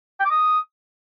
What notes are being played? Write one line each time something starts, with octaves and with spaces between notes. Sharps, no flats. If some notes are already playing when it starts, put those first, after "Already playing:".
G5
D6
D#6